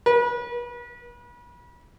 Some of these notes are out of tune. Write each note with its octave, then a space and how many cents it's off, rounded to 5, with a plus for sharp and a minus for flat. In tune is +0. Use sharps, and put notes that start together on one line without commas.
B4 -35